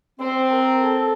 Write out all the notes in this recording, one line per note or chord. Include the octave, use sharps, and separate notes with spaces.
C4 C5
A#4
A4